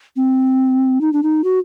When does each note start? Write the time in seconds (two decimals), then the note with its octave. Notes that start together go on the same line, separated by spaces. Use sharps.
0.16 C4
1.01 D#4
1.13 D4
1.23 D#4
1.44 F#4